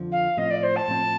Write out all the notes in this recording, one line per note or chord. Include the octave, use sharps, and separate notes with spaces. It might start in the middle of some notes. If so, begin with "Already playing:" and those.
Already playing: F2 D3 F3
F5
A2 F3 C4 D#5
D5
C5
A5
A2 F3 C4